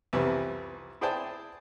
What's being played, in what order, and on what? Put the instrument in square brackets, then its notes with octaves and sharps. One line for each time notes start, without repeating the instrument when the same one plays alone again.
[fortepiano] C2 F2 E3 F3 G3 B3
E4 G#4 C5 D5 G5 A5